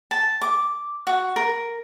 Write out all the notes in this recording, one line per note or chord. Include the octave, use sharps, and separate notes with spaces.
A5
D6
F#4
A#4